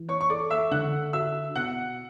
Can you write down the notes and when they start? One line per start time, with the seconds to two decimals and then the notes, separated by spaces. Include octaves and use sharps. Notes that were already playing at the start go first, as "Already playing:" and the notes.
Already playing: E3
0.09 C#5 C#6
0.21 C#6
0.30 A4 D5 D6
0.50 E5 E6
0.71 D3 F#5 F#6
1.13 F#4 E5 E6
1.55 B2 F#5 F#6